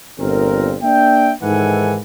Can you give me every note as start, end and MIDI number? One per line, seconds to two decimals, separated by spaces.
0.20 0.76 31
0.20 0.76 46
0.20 0.76 60
0.20 0.76 70
0.82 1.31 58
0.82 1.31 62
0.82 1.31 76
0.82 1.31 79
1.42 1.98 44
1.42 1.98 51
1.42 1.98 52
1.42 1.98 69
1.42 1.98 78
1.42 1.98 80